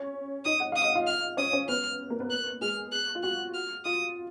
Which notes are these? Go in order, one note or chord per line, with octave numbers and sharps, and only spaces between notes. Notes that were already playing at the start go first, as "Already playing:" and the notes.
Already playing: C#4 C#5
D#4 D#5 D#6
F#5
F5 D#6
D#5
F4 F5
F6
C#4 C#5 D#6
C#4 C#5
B3 B4 F6
A#3 A#4
B3 B4
F#6
G#3 G#4 F6
F#6
F4
F#4 F#6
F6
F4 D#6